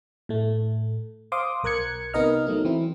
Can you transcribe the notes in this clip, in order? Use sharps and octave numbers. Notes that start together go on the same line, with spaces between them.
A2 A3
C5 F5 C6 D6 D#6
B1 A#4 F#6 G#6 C#7
C3 B3 D#4 A#4 D#5 F6
F#3 A3 D#4
E3 C4 E4